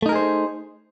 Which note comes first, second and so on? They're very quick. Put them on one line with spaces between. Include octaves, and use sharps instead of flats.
A3 D#4 A#4 G#4 C5